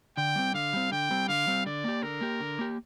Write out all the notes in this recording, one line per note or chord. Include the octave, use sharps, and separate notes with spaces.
D3 G5
G3 C4
D3 F5
G3 C4
D3 G5
G3 C4
D3 F5
G3 C4
D3 D5
A#3 G4
D3 A#4
A#3 G4
D3
A#3 G4